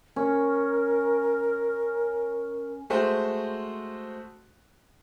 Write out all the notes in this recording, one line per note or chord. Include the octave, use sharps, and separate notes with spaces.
C#4 A#4
G#3 A3 F#4 C5